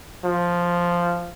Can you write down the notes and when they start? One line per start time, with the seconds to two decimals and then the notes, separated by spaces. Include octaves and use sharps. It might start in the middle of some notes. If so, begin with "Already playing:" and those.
0.24 F3